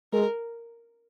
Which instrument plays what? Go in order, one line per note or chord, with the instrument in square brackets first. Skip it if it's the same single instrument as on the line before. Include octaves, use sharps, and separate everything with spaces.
[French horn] G#3 [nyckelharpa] A#4